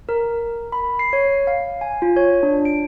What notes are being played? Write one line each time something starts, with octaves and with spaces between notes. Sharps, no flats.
A#4
B5
C7
C#5
F5
G#5
F4
C#5
D4
D7